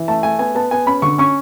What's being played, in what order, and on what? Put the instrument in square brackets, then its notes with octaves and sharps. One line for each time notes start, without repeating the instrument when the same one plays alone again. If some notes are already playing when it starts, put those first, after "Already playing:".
Already playing: [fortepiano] E3
A3 A5
A3 G#5
B3 G#5
B3 A5
B3 G#5
C#4 B5
D3 C#6
C#4 C#6